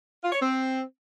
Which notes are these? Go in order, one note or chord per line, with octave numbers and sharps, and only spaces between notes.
F4
C#5
C4